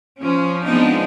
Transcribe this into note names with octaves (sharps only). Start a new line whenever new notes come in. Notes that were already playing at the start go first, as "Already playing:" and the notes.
F3 C#4
F3 G#3 B3 C4 D4 D#4